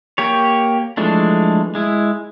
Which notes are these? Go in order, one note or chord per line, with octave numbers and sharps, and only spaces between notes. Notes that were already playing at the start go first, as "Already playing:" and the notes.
A#3 G4 C#5
E3 F3 G#3 A3 D4
G#3 E4